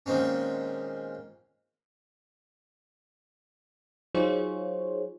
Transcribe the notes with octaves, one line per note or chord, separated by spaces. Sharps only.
A#2 D#3 G#3 C4 C#4
F#3 D#4 F4 G#4 C5 C#5